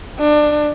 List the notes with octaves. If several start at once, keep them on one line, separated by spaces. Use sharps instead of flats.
D4